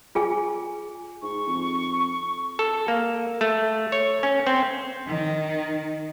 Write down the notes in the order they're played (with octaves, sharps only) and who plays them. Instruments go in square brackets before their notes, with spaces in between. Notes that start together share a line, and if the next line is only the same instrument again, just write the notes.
[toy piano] F4 G#4 G#5
[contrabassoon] G#2 [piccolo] C#6
[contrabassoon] F2
[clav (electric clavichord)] A4
A#3
A3
C#5
C#4
C4
[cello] D#3